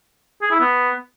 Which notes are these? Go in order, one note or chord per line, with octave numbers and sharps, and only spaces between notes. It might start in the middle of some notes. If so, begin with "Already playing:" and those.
G#4
E4
B3